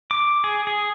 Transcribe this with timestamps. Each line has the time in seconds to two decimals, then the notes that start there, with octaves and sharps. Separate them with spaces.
0.11 D6
0.44 G#4
0.67 G#4